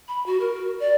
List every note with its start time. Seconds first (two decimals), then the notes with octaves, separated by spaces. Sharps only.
0.08 B5
0.26 F#4
0.40 A#4
0.56 F#4
0.80 D5